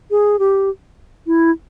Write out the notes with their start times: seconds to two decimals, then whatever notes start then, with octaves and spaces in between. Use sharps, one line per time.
0.11 G#4
0.39 G4
1.27 E4